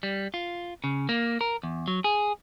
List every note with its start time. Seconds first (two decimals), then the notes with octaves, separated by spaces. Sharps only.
0.03 G3
0.34 F4
0.84 C#3
1.09 A#3
1.41 A#4
1.63 E2
1.88 F#3
2.04 G#4